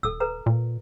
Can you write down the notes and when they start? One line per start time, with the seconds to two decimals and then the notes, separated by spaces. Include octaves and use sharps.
0.03 D#1 A4 E6
0.20 A4 B4 A#5
0.46 A#2